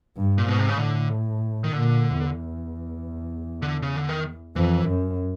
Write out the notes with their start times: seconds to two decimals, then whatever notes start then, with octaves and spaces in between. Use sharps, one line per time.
0.16 G2
0.38 A#2
0.47 G#2 B2
0.59 C3
0.69 C#3
0.79 A2 D3
1.64 D#3
1.73 A#2 D3
2.20 E2
3.62 D3
3.82 C#3
3.96 D3
4.09 D#3
4.56 F2 E3
4.87 F#2